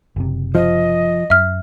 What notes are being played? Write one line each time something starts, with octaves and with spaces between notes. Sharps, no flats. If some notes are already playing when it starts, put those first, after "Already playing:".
F#1 C3
F3 D#5
F#2 E5 F6